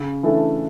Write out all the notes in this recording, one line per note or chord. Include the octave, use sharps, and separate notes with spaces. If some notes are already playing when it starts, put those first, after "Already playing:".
Already playing: C#3
E3 A3 D4 A4